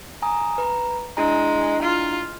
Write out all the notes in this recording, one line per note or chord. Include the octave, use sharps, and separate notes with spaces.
G#5 A#5 D#6
B4 A#5
G#3 D4 E4 A#5
F4